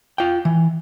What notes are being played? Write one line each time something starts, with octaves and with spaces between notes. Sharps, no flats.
F4 G5
E3